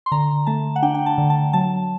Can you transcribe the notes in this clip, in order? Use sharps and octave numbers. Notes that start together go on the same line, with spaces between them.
C6
D3 A#5
A3 A5
F#5
D4 G5
G5
A5
D3
A5
F#3 A5